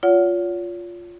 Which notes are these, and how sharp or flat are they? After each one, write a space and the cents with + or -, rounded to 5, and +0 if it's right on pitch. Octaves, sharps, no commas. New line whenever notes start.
F4 +0 C#5 +40 F#5 +0